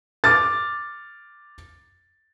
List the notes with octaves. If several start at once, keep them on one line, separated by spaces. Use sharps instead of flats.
D6 F6 A6